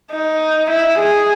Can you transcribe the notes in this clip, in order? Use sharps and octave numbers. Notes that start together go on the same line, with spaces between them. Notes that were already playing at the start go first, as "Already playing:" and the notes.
D#4
E4
G#4